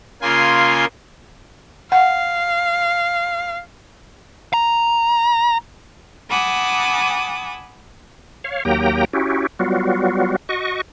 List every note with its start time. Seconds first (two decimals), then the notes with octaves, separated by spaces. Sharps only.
0.22 C#3 A#3 F4 G#5 C6
1.92 F5 F#5
4.53 A#5
6.30 F#5 G#5 A5 B5 D6 D#6
8.44 C#5 F5
8.65 D#2 F#3 A#3 G4 G5 A#5
9.13 C#4 E4 F#4 G4
9.59 F#3 G3 B3 F4 F#4
10.49 F#4 D#5 C#6